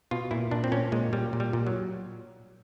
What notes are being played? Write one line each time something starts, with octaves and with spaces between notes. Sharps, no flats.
B2 F4
A#2 E4
A#2 D4
C4
A#2 C#4
A#2 G#3
A#2 G3
A#2
G3
A#2
F#3